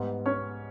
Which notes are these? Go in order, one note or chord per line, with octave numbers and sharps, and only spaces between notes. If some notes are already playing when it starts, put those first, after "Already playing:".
Already playing: G#2 G3 B3
C#4 C#5